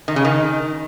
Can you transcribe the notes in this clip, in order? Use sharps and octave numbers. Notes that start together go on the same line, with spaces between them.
D#3
C#3
D#3